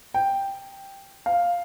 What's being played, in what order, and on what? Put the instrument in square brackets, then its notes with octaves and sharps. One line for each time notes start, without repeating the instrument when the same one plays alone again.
[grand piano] G5
F5